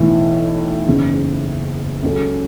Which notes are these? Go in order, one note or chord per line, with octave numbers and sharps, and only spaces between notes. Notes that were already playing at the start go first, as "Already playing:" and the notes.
Already playing: B1 A2 E3
F#1 E2 C#3
C#2 C#3 F#3 C#4 A4